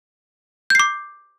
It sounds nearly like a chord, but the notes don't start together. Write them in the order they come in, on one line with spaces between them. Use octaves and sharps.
G6 C7 D6